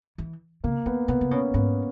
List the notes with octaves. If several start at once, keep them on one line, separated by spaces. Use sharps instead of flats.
E3
C#3 A#3
D#3 B3
B2 B3
C#3
B2 C#4
G#2 B3